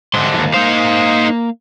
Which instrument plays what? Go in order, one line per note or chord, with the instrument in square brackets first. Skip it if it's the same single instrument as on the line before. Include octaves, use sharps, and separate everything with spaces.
[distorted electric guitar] G#2 D3 [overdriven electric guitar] G3 C6
[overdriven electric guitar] D#2 E3
[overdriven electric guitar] A#3 F5 [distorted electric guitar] D#4 C5